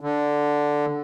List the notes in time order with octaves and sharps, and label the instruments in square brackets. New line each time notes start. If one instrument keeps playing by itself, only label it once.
[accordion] D3